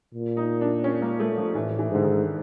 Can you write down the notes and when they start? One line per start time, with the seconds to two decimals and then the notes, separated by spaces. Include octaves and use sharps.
0.14 A#2
0.37 D#4
0.61 D4
0.84 C#4
1.02 A#3
1.20 A3
1.37 F3
1.55 A2 E3
1.79 E3
1.90 G#2 D3
2.03 D#3